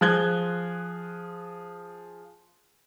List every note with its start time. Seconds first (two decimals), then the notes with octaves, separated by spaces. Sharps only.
0.01 F3 G#4 F#6 G#6 G7